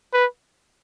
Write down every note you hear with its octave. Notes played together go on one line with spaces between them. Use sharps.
B4